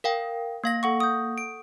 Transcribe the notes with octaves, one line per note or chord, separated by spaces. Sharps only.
A#4 F5 G5
A#3 F5 A#6
A4 F#5 C#6
D#6 G6
D7